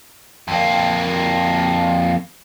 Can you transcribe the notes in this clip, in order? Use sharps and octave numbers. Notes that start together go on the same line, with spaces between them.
F2 A#3